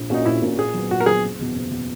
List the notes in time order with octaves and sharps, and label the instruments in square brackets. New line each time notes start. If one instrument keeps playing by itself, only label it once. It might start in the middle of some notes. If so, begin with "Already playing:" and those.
Already playing: [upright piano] A#1
[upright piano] A#2 A#3 C#4 F#4 [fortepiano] D#4
[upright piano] A#1 [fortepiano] E4
[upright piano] A#2 A#3 C#4 F#4
[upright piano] A#2 [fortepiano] G#4
[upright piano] F#3 B3
[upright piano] A#2 [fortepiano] F#4
[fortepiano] A#4
[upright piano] F#3 B3 [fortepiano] G#4
[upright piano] F#1
E2 B2
F#1
B2